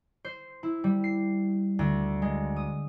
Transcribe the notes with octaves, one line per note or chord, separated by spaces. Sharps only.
C5
E4
G3
C7
D2
G#3
D#6